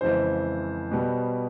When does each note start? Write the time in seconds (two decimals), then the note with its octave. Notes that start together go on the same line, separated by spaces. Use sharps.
0.01 F2 C#3 E3 G#3 C5
0.91 B2 G3 B3